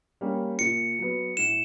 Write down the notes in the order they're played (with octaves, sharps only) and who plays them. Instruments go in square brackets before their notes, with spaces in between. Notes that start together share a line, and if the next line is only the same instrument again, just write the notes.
[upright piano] G3 A#3 C#4
[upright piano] A#2 [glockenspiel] C#7
[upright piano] F#3 B3
[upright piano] A2 [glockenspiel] E7